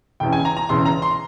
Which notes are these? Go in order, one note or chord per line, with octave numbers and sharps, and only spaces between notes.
E1 E2 C#3 G5
G#5
A#5
A#5
E1 E2 C#3 C6
A#5
C6